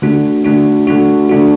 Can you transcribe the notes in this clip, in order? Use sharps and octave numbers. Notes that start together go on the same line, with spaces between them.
D3 A3 D4 F#4
D3 A3 D4 F#4
D3 A3 D4 F#4
D3 A3 D4 F#4